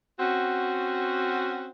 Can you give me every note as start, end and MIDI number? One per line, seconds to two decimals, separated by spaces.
0.19 1.69 60
0.19 1.69 61
0.19 1.69 66